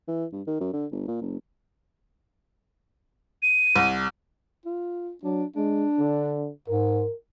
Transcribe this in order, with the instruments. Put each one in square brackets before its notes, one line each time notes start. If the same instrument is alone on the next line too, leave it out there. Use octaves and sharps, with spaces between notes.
[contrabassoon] E3
G2
D#3
F#2
D3
G1
A#2
F#1
[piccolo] D#7
[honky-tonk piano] C2
[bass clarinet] F4
[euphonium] F#3 [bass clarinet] D4
[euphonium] G#3 [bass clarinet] D4
[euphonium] D3
[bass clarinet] G#2 [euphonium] A#4